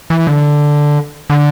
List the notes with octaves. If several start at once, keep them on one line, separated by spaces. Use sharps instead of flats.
E3
D3
D3